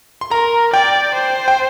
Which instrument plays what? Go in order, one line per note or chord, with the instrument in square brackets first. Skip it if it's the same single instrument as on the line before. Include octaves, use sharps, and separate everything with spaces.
[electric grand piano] C6
[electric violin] A#4 [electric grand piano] A#5
[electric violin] D5 [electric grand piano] G5
[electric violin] C5
[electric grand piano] G5